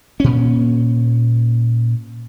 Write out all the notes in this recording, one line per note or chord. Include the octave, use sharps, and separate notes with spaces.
A#2 C#4